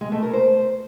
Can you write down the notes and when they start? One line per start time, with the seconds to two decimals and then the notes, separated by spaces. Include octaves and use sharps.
0.01 G#3
0.12 A3
0.23 A#4
0.33 C5